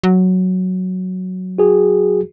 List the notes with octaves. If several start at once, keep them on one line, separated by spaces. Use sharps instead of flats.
F#3
F#4 G#4